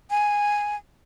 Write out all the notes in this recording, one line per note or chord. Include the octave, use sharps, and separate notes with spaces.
G#5